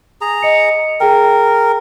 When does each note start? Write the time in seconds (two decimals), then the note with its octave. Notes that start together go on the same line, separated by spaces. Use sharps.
0.21 G#4 A#5
0.42 D#5 C#7
1.00 G#4 A#4 G5